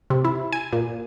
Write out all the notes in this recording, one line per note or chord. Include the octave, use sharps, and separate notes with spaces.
C3
E4
G#5
A#2